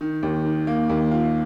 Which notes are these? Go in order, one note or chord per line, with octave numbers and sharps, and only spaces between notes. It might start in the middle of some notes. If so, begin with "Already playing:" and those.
D#3
D#2
D#3
A#3
D#2
F4